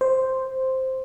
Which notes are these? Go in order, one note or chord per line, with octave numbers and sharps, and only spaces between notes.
C5